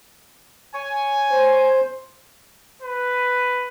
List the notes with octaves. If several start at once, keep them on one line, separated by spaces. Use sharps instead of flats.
C#5 G#5
C5
B4